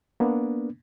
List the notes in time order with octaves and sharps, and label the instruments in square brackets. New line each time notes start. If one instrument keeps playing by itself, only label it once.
[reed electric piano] A#3 B3 D4